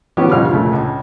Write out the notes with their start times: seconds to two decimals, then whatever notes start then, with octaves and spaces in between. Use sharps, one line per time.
0.17 D3 F3 F#3 B3 C#4 G4
0.32 C2 F2 D3 G3 F4 F6
0.50 A#2 C#3 A3
0.73 C#2